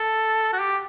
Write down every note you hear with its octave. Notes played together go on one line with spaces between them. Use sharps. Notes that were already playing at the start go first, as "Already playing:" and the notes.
Already playing: A4
F#4
G4